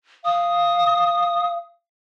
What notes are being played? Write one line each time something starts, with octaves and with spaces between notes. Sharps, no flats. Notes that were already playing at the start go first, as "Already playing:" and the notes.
F5 D#6